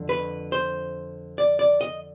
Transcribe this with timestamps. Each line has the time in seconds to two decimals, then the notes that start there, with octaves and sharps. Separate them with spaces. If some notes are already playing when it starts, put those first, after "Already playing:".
Already playing: F2 D3 F3
0.09 B4
0.52 C5
1.38 D5
1.59 D5
1.81 D#5